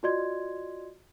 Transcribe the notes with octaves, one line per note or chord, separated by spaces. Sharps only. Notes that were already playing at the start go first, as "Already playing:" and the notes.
F4 F#4 D5 D#5 C6 G#6